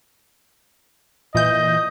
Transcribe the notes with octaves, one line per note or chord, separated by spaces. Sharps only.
A#2 E3 D#5 G6